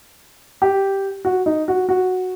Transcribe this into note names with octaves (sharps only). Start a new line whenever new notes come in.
G4
F#4
D#4
F#4
F#4